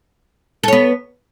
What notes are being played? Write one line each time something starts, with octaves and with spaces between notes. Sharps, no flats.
B3 A4 C#5